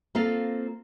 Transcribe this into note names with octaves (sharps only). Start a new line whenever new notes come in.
A#3 C4 F4 A4 F5